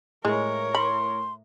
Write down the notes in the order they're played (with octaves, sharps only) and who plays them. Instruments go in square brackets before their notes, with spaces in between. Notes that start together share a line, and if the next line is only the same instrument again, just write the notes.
[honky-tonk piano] A2 [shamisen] G#3 [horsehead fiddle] A#4 C#5
[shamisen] B5 [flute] C6